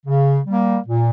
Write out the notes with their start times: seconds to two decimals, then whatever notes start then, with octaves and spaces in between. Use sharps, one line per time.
0.06 C#3
0.46 G3 A#3
0.87 A#2